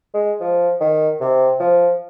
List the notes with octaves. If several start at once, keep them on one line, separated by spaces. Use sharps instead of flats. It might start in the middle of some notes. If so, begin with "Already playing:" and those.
G#3
F3
D#3
C3
F3